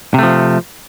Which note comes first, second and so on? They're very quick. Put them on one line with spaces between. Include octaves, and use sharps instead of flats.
C3 A3 F3